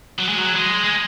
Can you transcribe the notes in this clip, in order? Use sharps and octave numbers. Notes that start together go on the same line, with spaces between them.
F#3
G#3
F#3
G#3
G#3